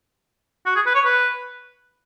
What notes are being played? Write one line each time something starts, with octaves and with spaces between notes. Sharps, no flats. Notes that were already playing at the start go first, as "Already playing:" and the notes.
F#4
G#4
B4
C#5
B4